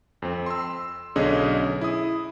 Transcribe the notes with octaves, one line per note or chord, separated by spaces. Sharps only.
F2 C4
C6 E6
B1 D3 C#4 G#4 D#5
E4 D#6